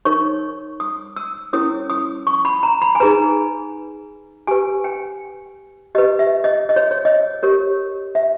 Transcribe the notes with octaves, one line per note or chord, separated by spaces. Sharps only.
D#4 A#4 C#5 C#6
D#6
E6
C#4 E4 A#4 C#5 D#6
D#6
C#6
B5
A#5
B5
G#5
D#4 G#4 B4 A#5
G4 B4 G#5
G5
G4 B4 D#5
E5
D#5
D#5
C#5
C#5
D#5
G4 A#4 C#5
E5